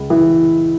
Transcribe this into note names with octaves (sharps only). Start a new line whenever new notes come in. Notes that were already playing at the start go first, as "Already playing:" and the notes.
Already playing: C#2
E3